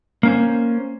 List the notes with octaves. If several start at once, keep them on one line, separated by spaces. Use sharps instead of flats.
A#3 C#4 C5